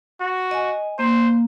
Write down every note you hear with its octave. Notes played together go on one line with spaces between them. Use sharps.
F#4
D#5 G#5
A#3 C5